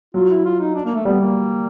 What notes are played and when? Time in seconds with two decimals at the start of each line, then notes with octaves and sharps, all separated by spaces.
0.14 F#3 F4
0.29 E4
0.45 F4
0.60 D#4
0.75 D4
0.85 A#3
0.95 A3
1.05 G3 B3
1.20 A#3